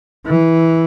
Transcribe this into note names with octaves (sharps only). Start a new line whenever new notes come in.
E3